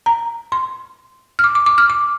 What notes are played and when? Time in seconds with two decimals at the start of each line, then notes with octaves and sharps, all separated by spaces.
0.06 A#5
0.52 C6
1.39 F6
1.44 D6
1.55 D6
1.66 D6
1.78 F6
1.90 D6